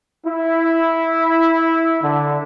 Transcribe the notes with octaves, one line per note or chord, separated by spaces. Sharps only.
E4
D3